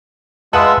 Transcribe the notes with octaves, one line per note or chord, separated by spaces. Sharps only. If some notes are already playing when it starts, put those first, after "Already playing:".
G#3 F4 B4 E5 F#5 A5 D#6 E6